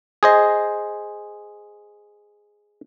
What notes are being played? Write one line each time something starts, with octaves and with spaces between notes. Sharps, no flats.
G#4 C5 D#5